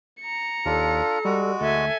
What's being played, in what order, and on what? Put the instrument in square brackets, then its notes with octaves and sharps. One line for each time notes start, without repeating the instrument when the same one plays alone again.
[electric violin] A#5 C#7
[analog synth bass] D#2 [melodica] D4 F4 [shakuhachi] A4
[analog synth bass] G3 [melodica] G#3 F#4
[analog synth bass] D2 [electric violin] A4 G#5 [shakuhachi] E5